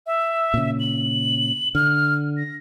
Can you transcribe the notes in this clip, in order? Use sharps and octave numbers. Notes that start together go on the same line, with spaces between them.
E5
A#2 C#3
F#7
D3 F6
A#6